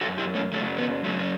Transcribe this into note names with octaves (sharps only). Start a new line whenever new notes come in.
F#2 C#3 F#3 F#4 A4
E4 G4
A3 C#4
F#2 C#3 F#3 A3
B3
F#2 C#3 F#3 A3
C#4